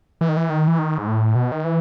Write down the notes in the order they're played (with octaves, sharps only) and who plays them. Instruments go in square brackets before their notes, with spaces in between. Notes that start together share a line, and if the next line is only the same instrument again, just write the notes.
[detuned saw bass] E3
D#3
E3
D#3
E3
D#3
G#2
A2
B2
D#3
E3